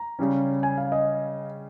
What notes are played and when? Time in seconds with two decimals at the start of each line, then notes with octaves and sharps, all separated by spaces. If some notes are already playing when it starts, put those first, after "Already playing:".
Already playing: A#5
0.19 C#3 G3 C#4
0.63 G#5
0.78 F5
0.92 D#5